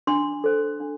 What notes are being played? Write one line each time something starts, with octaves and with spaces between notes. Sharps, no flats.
D4 C6
A4 C5
D4